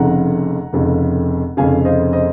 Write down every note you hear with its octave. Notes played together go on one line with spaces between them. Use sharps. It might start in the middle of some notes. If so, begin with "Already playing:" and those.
Already playing: F1 F2 C#3 F#5 A#5
F1 F2 C#3
F1 F2 C#3 F5 G#5
C5 D#5
C5 D#5